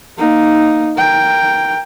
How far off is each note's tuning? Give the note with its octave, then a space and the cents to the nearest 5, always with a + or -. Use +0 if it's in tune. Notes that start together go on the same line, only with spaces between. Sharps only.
A#3 +0 D#4 +0
A#4 +0 G5 +5